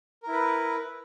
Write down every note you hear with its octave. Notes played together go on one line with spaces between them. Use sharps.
E4 A#4 B4